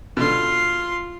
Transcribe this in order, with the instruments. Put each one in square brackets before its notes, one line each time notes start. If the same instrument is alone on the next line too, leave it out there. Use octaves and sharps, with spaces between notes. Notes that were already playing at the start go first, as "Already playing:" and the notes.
[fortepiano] B2 D3 [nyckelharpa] F4 C6